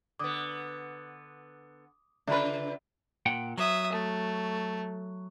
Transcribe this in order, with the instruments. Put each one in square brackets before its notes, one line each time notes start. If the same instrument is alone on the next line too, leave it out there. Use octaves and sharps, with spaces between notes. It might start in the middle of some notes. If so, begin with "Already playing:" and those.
[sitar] D3 B3 [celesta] D6 D#6
[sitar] C#3 F4 B4 [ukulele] D4 B5 [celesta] E5
[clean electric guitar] A#2 F#5 G5
[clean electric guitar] F#3 [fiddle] E5 D#6
[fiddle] A3